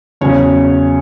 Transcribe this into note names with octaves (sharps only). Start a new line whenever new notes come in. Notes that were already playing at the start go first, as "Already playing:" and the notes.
E2 C#3 F#3 C#4 C#5